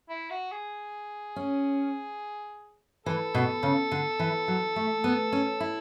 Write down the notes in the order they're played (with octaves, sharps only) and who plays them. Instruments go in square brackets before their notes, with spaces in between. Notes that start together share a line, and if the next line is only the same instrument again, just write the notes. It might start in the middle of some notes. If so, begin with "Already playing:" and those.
[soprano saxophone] E4
F#4
G#4
[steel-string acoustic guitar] C#4
[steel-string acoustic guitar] E3 [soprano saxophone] A4
[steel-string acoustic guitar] B2
C#3
D3
E3
F#3
A3
B3
C#4
E4